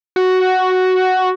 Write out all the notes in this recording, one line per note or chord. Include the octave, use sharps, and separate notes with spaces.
F#4